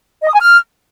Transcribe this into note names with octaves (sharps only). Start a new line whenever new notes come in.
D#5
D#6
G#5
F6